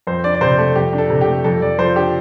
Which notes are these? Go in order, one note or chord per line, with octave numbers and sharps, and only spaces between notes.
F2 C5
D4 D5
D5
C3 C5
A3 A4
F2 G4
D4
A4
C3
G4
A3
F2 A4
F2 D5
F3 C5
D4 G4